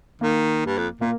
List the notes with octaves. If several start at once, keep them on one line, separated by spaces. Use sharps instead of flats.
D#3 A#3
G2
F2
A#2 A#3